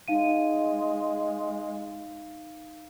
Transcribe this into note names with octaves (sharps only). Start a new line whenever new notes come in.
G#3 D#4 F5 D#7